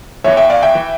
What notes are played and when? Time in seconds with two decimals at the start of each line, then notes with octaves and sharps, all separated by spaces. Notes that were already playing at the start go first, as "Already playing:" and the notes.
0.24 E2 E3 C#5 E5
0.37 E5 G5
0.50 D5 F5
0.62 E5 G5
0.75 E3